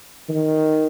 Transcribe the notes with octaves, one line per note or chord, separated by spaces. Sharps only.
D#3